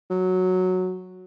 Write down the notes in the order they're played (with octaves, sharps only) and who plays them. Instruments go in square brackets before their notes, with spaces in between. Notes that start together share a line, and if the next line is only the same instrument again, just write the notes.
[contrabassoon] F#3